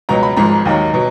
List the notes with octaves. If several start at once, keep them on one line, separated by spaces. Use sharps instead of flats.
C#2 B2 F#3 A#5
B5
G#1 G#2 F3 A#5
D#2 D#3 F#3
B2 F#3